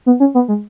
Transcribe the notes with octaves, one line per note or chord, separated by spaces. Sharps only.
B3
C#4
B3
G#3